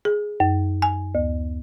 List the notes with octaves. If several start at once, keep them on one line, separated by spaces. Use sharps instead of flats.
G#4
F#2
G#5
D2